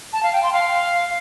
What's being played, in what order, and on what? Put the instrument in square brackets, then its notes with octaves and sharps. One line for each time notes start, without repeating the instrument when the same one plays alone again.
[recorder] A5
F5
G5
C6
F5